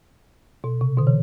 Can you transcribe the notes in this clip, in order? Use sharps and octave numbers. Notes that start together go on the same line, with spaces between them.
B2
C3
B2 D3
E3